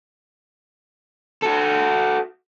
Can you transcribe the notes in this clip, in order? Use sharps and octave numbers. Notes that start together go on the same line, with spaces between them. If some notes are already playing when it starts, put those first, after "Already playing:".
F#4 A4